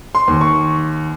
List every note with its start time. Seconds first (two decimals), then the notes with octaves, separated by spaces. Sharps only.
0.15 C6
0.28 D#2
0.41 C#6